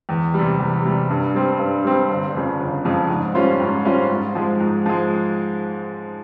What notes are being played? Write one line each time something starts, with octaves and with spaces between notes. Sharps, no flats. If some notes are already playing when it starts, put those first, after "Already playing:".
E2
C3 G3
E2
C3 G3
G2
G3 C4
G2
G3 C4
G1
F2 C#3 F3
G1
F2 C#3 F3
G#2
G3 C#4 F4 C5
G#2
G3 C#4 F4 C5
G#2
F3 G#3
G#2
F3 G#3